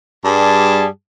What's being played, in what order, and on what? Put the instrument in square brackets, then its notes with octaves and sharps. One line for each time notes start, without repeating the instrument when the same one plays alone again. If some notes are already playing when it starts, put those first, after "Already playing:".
[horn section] G2 G3 G#4 A5